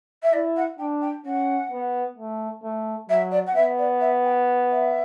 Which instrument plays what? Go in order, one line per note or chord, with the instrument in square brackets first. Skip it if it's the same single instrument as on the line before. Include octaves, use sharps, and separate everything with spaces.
[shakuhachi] E5
[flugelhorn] E4 [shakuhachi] D5
[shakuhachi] F#5
[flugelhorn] D4 [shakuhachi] G5
[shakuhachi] G5
[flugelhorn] C#4 [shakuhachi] F#5
[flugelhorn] B3
A3
A3
[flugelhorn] F#3 [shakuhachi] E5
[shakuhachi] D5
F#5
[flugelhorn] B3 [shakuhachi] E5
[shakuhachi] D5
E5
G5
E5